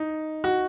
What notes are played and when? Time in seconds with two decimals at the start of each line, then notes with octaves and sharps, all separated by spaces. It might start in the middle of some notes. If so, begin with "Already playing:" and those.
Already playing: D#4
0.44 F#4